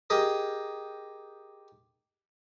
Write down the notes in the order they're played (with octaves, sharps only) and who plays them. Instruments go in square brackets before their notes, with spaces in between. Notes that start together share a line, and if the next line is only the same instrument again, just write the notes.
[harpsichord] G4 G#4 A#4 D#5